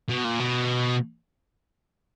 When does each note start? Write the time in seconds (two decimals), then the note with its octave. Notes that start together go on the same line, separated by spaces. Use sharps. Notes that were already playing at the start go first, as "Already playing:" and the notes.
0.09 B2
0.24 A#2
0.40 B2